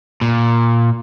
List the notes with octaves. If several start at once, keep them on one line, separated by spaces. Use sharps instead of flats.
A#2